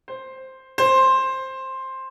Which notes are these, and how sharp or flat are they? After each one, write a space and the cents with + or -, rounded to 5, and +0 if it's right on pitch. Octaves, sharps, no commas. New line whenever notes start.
C5 +5
C5 +10